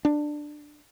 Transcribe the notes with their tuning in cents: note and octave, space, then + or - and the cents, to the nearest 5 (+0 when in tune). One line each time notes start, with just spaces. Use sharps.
D4 +15